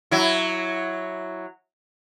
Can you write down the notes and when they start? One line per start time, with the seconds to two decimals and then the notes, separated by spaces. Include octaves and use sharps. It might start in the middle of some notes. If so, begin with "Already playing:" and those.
0.11 F#3 E4